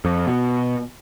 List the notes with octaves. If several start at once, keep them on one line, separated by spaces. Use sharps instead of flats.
F2
B2